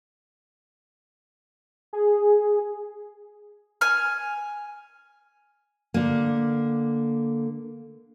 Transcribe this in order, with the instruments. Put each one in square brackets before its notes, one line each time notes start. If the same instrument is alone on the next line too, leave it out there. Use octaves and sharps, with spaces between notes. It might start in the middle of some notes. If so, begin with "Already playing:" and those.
[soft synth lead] G#4
[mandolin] G#5 F6
[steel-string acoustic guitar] D3 A#3